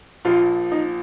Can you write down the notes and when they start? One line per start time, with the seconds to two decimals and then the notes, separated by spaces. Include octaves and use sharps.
0.25 A#1 A#2 F3 F4
0.72 D#4